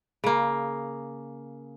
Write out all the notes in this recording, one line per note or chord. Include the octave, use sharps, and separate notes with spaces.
C#3 A#3